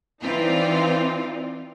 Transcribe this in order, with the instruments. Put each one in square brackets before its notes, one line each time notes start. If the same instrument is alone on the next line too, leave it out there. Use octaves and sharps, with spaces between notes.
[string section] E3 C4 D#4 F4 D5